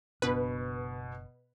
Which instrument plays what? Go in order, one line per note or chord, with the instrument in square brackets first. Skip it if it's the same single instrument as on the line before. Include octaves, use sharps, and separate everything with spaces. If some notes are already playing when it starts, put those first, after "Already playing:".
[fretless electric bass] F#1 D4 [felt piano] B2 [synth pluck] B4